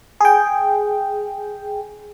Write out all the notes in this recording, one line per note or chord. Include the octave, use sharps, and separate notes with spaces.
G#4 G5